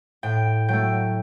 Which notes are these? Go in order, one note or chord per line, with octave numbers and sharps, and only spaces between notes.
A2 G5
F#3 A3 G5